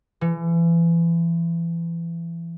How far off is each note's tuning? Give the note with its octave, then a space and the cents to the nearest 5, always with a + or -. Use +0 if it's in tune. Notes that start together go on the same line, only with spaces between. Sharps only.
E3 +30